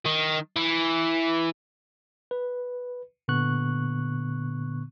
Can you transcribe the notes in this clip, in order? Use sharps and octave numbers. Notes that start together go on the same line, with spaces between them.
D#3
E3
B4
A#2 D3 B3 C#6 F#6